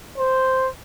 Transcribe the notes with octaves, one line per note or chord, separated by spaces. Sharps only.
C5